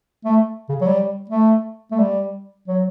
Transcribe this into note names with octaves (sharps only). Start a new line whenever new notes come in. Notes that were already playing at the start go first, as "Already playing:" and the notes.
A3
C#3
F#3
G3
A3
A3
G3
F#3